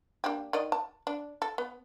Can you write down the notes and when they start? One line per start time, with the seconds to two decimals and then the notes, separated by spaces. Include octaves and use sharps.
0.24 A#3 D4 G4
0.53 D#3 D5 D#5
0.72 A5
1.07 D4
1.42 A4
1.58 B3